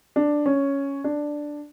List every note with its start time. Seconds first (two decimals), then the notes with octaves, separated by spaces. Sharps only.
0.16 D4
0.46 C#4
1.04 D4